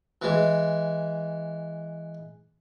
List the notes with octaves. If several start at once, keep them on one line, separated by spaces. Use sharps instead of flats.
E3 G#3